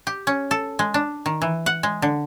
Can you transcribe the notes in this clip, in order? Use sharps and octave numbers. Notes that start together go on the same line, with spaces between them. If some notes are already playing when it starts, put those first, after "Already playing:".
G4
C#4
A4
G#3
D4
D#3
E3
F#5
G#3
D3